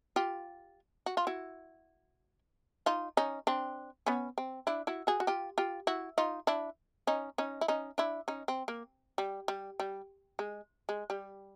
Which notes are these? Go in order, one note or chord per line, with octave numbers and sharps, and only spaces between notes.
F4 G4
F#4
F4
E4 F#4
D#4 F4
C#4 D#4
C4 D4
B3 C#4
C4
D4 E4
E4 F#4
F#4 G#4
F#4
F4 G4
F4 G4
E4 F#4
D#4 F4
D4 E4
C#4 D#4
C#4 D#4
E4
C#4 D#4
D4 E4
C#4 D#4
C4
A#3
G3
G3
G3
G#3
G#3
G3